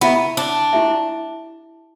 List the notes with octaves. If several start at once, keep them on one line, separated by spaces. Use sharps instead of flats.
B3 E4 G4 E5
D4
E4 G4 E5